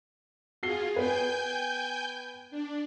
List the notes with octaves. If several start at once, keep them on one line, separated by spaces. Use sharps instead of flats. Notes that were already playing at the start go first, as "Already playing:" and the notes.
F4 F#4 G#4 C7 G7
B3 B4 G5 G#5 G6
D4